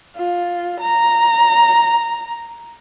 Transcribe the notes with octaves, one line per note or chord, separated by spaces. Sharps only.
F4
A#5